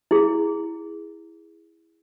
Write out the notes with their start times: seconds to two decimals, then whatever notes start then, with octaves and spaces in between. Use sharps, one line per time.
0.11 E4 G#4